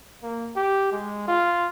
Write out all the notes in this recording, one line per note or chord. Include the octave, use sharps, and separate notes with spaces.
A#3
G4
G#3
F4